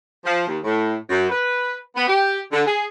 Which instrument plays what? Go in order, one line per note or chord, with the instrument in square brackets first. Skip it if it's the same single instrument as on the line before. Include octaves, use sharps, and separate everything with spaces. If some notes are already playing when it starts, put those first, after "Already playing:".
[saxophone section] F3
D#2
A2
F#2
B4
B3
G4
D3
G#4